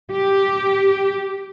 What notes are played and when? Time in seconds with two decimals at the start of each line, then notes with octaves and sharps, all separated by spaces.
0.11 G4